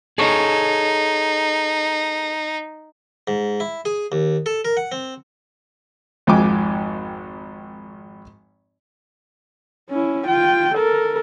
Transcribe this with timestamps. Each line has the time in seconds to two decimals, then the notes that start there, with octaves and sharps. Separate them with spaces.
0.18 D#4 G#4 A4 C#5
3.28 G#2
3.60 E4
3.85 G#4
4.12 D#2
4.46 A4
4.65 A#4
4.77 F#5
4.92 C4
6.27 G#1 F2 G#2 G5 G#5 D6
9.90 C#4 E4
10.28 F4 G5
10.75 A4 A#4